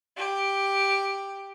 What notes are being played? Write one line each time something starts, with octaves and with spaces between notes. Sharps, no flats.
G4